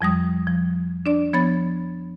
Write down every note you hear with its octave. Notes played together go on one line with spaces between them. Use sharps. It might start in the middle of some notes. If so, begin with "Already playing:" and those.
F2 F3 G3 D#6
F3
D4 D5
F3 B3 C#5 B5 A6